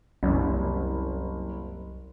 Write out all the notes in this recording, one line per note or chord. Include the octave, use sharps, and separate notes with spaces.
F#1 C2